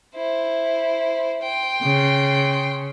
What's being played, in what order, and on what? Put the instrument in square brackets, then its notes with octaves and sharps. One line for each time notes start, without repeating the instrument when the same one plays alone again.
[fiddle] E4 C5
G5 C6
[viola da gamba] C#3